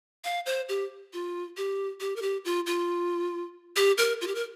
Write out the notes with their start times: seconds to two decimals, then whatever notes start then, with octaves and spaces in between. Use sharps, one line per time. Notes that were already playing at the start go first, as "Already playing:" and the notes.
0.24 F5
0.46 C5
0.69 G4
1.13 F4
1.57 G4
2.00 G4
2.16 A#4
2.22 G4
2.45 F4
2.66 F4
3.76 G4
3.98 A#4
4.21 F4
4.27 G4
4.35 A#4